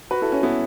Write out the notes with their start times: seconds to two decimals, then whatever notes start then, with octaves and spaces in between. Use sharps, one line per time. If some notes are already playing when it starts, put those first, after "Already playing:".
0.11 F#4 B4
0.22 E4 A4
0.32 C#4 F#4
0.43 B3 E4